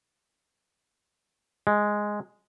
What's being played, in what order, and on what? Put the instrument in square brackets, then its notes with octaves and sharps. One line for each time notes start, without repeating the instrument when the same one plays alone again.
[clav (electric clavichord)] G#3